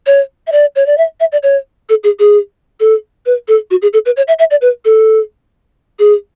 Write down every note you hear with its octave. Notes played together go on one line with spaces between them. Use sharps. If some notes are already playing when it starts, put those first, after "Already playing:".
C#5
E5
D5
C#5
D5
E5
E5
D5
C#5
A4
G#4
G#4
A4
B4
A4
F#4
G#4
A4
B4
C#5
E5
E5
D5
B4
A4
G#4